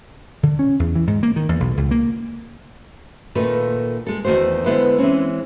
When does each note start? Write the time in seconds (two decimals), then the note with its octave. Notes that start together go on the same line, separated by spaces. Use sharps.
0.43 D3
0.59 C#4
0.79 E2
0.95 E3
1.07 G#2
1.23 A#3
1.36 D#3
1.49 E2
1.60 B1
1.77 C#2
1.91 A#3
3.35 A#2 D#3 A3 F4 A4 B4
4.06 G#3 A4
4.24 E2 D#3 A3 F#4 C5
4.66 D3 G#3 B3 E4 B4 C5
4.98 E3 G#3 C4 C#4